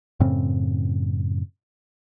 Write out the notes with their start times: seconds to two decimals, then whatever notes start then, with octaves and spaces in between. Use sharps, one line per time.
0.20 F#2 A2 C#3 C4